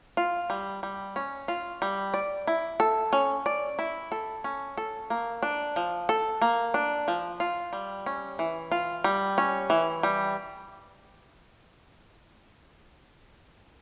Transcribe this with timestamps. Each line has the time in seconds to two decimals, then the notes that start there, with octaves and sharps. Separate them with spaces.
0.17 F4
0.50 G3
0.83 G3
1.16 C#4
1.48 F4
1.82 G3
2.14 D5
2.47 E4
2.80 A4
3.13 C#4
3.46 D5
3.79 E4
4.12 A4
4.44 C#4
4.78 A4
5.10 A#3
5.43 D4
5.76 F3
6.09 A4
6.42 A#3
6.74 D4
7.08 F3
7.40 F4
7.73 G3
8.06 C#4
8.39 E3
8.72 F4
9.04 G3
9.38 C#4
9.70 E3
10.03 G3